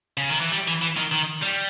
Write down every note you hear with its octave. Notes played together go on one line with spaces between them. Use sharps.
C#3
D#3
E3
G3
E3
E3
D#3
D#3
G3